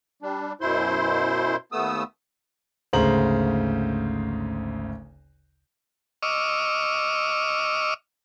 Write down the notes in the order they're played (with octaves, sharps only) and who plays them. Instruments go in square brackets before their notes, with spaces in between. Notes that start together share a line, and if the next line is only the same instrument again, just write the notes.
[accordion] G3 D4
F#2 B2 E4 C5 C6
D#2 A3 B3 D#6 E6
[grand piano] G#1 D2 C#3 C5 A#5 F#7
[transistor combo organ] D#5 C#6 D6 E6 F6